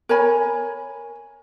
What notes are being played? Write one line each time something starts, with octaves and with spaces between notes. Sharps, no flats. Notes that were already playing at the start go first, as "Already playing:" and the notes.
A#4 C#5 G#5 B5